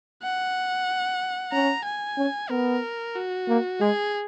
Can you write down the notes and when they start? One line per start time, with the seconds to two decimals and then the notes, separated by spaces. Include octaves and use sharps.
0.23 F#5
1.52 C#4 A#5
1.85 G#5
2.17 C#4
2.50 B3 A#4
3.16 F#4
3.48 A#3
3.80 G#3 G#4